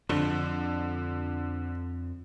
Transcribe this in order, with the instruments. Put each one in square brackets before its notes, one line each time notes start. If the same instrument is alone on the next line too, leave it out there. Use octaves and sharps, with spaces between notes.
[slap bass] F2 F3 [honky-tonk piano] D3